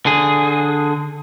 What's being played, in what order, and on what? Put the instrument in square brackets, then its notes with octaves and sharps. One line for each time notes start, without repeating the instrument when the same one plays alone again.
[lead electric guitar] D3 G#4